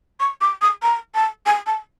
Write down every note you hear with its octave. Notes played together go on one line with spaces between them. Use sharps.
C#6
D6
D#6
A#5
A5
G#5
A5